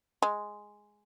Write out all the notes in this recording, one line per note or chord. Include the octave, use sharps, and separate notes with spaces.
G#3